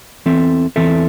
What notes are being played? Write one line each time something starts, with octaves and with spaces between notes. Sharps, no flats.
E2 E3 C4 A4 E5
E2 E3 C4 A4 E5